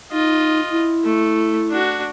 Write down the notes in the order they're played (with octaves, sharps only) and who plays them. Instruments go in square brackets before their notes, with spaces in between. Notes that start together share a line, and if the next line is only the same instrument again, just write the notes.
[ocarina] D#4 [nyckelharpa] F4 D#5
[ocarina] E4
[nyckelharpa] A3
D4 F#4